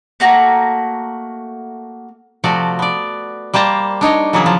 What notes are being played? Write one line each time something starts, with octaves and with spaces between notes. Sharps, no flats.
A3 A#3 F#4 A#5
C3 F3 A3 F#4 D5
B3 D5
G3 A#3 C5 A5 A#5
D4 D#4 C#5 D#5
C#3 E3 F#3 A#3 B3 G#4
F3 A5